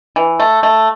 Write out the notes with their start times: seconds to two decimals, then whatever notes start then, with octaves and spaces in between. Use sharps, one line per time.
0.16 E3
0.40 A3
0.63 A3